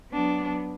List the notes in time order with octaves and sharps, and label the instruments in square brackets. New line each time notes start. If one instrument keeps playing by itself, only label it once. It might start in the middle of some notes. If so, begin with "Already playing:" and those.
[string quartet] F#3 B3 D4